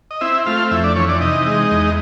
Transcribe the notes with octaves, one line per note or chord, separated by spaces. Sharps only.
D#5
C4 E4 E5
A3 F4 F5
F2 E4 E5
D4 D5
E3 C#4 C#5
D4 D5
C3 D#4 D#5
G#3
E2